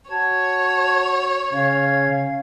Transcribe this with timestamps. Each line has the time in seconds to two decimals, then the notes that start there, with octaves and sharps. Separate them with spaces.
0.11 F#4 C#5 A5 G#6
1.53 C#3 C#4 F5 G#6